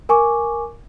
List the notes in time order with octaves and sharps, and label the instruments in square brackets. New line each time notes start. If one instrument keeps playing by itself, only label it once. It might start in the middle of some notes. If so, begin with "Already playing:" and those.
[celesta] A#4 G#5 C#6 D6